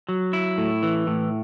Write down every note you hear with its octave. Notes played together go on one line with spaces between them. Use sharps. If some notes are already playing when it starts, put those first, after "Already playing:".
F#3
E4
A2
E3
A2